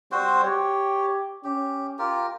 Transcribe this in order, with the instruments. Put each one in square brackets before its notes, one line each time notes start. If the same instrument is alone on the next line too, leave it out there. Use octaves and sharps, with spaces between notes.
[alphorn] G3 [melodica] C4 F#4 C5
[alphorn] G4 [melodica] C#5
[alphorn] C#4 [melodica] G4
[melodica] F4 G4 A#4